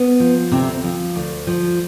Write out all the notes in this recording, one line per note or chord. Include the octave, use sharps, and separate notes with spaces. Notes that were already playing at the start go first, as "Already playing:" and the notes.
Already playing: B3
F3
D2 C3 C4
F3
D2
F3